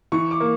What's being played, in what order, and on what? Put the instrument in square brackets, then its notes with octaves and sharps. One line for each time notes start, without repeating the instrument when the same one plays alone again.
[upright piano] E3 C#6
D6
A#3